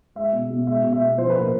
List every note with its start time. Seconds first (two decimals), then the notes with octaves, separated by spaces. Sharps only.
0.15 G#3 E5
0.33 B2
0.50 B2
0.67 G#3 E5
0.84 B2
0.92 E5
1.01 B2
1.18 F3 C5
1.30 B4
1.36 A#2 A#4